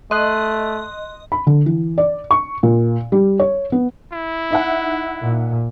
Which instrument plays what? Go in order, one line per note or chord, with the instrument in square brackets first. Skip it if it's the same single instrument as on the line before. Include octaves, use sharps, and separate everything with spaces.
[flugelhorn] A3 [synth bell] D#5 [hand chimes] C6 F#6
[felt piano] B5
D3
E3
D5
C#6
A#2
G3
C#5
B3
[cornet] E4
[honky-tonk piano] D#4 E5 F#5
[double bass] A#2